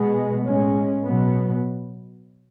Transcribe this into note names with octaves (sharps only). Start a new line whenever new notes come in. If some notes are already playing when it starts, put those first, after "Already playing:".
Already playing: B2 G#3 B3
A2 G#3 C#4
B2 F#3 B3